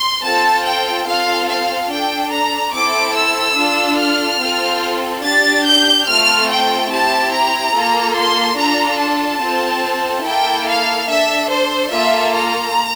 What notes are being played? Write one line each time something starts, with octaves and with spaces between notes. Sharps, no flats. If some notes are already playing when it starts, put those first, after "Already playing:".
Already playing: C6
C4 F4 A4 A5
G5
C4 F4 A4 F5
F5
D4 A4 G5
A#5
C4 E4 A4 D6
E6
D4 F4 A4
F6
C4 F4 A4
D4 G4 A6
G6
A3 C4 F4 A4 F6
G5
C4 E4 G4 A5
A#5
A#3 F4 A4
C6
D4 F4 A4 A#5
A5
C4 F4 A4
A#3 E4 A4 G5
F5
D4 A4 E5
C5
A#3 F4 A4 E5
A#5